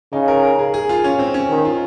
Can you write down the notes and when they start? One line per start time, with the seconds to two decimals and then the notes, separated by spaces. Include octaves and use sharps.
0.13 C#3 D#4
0.28 A#4
0.43 A#4
0.59 G#4
0.74 G#4
0.89 F4
1.04 C#4
1.19 C4
1.34 C#4
1.49 D#3
1.65 F4